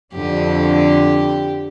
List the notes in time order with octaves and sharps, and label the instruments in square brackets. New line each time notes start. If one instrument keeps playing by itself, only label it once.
[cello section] F2 D3 [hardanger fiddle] G4